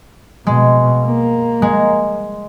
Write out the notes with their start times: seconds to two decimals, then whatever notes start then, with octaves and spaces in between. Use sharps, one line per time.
0.47 B2 G#3
1.05 A#3
1.62 G#3